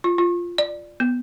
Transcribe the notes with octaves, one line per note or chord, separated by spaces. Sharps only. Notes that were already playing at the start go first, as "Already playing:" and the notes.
F4
F4
D5
B3